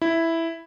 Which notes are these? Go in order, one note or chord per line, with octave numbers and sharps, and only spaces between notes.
E4